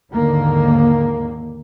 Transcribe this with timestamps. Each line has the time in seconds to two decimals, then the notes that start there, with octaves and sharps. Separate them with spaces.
0.13 D#2 G#2 D3 D#3 A#3